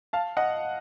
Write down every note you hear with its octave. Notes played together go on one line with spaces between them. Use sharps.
F5 A5
D#5 F#5